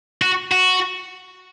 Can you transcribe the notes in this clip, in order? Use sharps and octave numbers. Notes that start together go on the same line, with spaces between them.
F#4
F#4